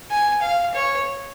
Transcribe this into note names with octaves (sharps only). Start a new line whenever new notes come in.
G#5
F5
C#5